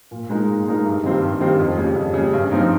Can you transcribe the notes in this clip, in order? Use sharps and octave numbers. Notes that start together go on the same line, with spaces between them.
A#2
G#3 D#4 A#4
A#2
G#3 D#4 A#4
G2
D#3 G3 C4 G4
G2
D#3 G3 C4 G4
F2
C#3 G3
F2
C#3 G3
G2
F3 C4 D#4